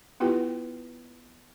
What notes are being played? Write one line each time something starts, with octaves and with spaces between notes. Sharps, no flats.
B3 E4 F4 G4 B4 G5